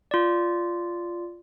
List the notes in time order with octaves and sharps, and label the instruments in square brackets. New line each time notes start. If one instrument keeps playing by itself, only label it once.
[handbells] F4 D5